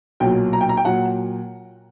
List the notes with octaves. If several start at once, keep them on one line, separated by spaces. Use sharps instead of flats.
B1 A#2 F#3 G5
A#5
G5
A#5
G5
A#2 F#3 F#5